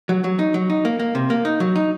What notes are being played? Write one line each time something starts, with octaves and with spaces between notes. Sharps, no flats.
F#3
F#3
D#4
F#3
D#4
A#3
A#3
C3
A#3
D#4
F#3
D#4